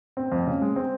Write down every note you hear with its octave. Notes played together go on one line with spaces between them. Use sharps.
C4
F2
C#3
G#3
C4